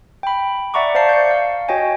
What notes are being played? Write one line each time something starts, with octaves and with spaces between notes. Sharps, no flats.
G5 B5
D5 E5 F#5 A#5 C#6 D6
C5 D5 F5 A5 C7
G6 C#7
F5
F#4 C#5 D#5 G5 G#5